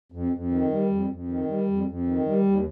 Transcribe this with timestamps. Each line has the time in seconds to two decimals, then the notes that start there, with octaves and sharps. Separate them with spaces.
0.12 F2
0.32 F2
0.51 D#3
0.71 G3
0.90 F2
1.10 F2
1.28 D#3
1.48 G3
1.67 F2
1.86 F2
2.06 D#3
2.26 G3
2.45 D#2